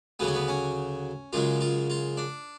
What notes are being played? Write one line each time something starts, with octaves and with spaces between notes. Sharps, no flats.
D2 C#3 F#3 B3
C#4
B3
C#4
F#2 C#3 G#3 F4
F4
F4
D4